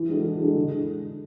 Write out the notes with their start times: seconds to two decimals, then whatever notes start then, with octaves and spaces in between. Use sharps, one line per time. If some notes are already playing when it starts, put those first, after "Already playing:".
Already playing: E3
0.09 G#3 D4 F#4 A4
0.24 E3
0.40 G#3 D4 F#4 A4
0.56 D3